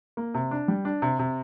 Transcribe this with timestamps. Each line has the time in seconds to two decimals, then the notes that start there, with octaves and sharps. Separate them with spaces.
0.17 A#3
0.34 C3
0.51 D4
0.68 G3
0.85 D4
1.02 C3
1.19 C3